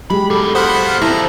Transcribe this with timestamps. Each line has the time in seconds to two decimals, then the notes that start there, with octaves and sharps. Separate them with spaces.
0.10 F#3 G#3 G4 B5
0.30 B3 D4 A4
0.55 B3 F4 C5 F#5 B5
1.02 D3 F3 C4 E4 A#5